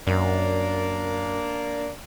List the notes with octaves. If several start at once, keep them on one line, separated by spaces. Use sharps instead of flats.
F#2 A#3 D4